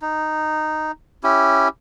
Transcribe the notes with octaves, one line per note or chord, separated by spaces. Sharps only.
D#4
C#4 E4 G4